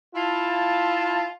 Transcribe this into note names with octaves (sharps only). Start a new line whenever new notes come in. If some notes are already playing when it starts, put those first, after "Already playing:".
E4 F4 A5